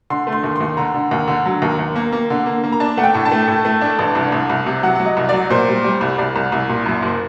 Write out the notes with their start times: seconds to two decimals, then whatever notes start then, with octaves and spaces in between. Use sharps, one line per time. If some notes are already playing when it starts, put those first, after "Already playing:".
0.10 D3 C6
0.27 A3
0.32 C6
0.44 D#2
0.56 D#2 C6
0.77 D3 A#5
0.94 D3
1.11 D#2
1.28 D3
1.46 F#3
1.62 D#2
1.79 D#2
1.96 A#3
2.12 A#3
2.30 D3
2.46 A#3
2.64 A#3
2.72 A#5
2.80 D4 A5
2.97 A3 F#5
3.03 G5
3.14 A2
3.25 A5
3.32 A3
3.48 A2
3.65 A3
3.81 D4
3.99 A1
4.15 C2
4.32 C2
4.49 C2
4.66 C3
4.83 F#3 F#5
4.95 F#3 F#5
5.05 D#5
5.17 C2
5.29 F#3 D5
5.50 A#2 C5
5.68 G3
5.84 G3
6.01 C2
6.18 C2 D5
6.36 C2
6.52 C2
6.69 A#2
6.86 F#2
7.02 F#1